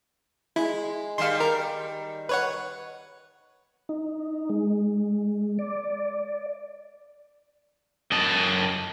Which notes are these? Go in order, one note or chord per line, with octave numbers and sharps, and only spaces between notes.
G#3 E4
D#3 G3 F5 C6
A#4
B4 C#5 F#5
D#4
G#3
D5
F#2 D#5 A5